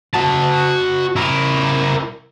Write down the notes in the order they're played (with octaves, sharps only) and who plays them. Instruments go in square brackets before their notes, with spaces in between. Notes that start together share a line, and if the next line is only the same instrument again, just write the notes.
[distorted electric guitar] F#4 A5
E4 A#4